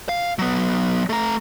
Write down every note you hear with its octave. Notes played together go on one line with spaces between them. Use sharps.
F5
F#3 B3
A3 A#5